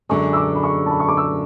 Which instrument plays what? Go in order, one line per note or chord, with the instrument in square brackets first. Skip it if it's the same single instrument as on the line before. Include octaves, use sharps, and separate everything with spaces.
[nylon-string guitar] F#2 D3 G#3 [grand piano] C#6
[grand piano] E6
D6
B5
C#6
A5
B5
C#6
D6
E6